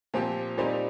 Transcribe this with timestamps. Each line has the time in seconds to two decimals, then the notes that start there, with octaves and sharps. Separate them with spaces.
0.14 A#2 F3 C4 G4
0.58 A#2 G3 C4 D#4 G4